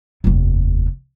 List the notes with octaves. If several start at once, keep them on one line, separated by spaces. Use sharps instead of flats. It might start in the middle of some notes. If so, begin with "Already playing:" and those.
F1 D#2